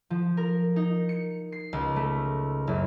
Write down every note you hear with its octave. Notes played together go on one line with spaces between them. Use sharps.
F3
A#4
D#4
C#7
C7
C#2
A3
F#1